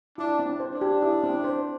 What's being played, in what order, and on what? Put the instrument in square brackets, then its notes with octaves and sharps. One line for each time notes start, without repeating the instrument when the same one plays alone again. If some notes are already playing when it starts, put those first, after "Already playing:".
[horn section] D4 [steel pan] E4
[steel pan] C4
C5
[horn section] D4
[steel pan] G4
E4
C4
C5